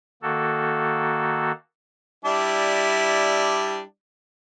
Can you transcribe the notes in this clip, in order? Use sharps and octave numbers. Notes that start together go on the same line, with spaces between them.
D#3 A#3 F#4 A4
G3 D4 E4